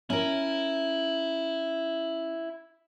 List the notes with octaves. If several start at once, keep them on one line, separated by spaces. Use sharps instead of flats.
C#4 E4 A#4